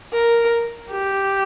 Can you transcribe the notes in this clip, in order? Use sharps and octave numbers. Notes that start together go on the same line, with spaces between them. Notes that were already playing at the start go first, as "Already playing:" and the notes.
A#4
G4